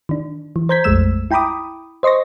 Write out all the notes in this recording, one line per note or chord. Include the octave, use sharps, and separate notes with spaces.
D#3 D4
E3
C5 A#5 G6 G#6 B6
A#1 F2 G#3 A3 E6 E7
E4 G5 A#5 B5 D6 D#6
C5 D#5 C6 C#6 A#6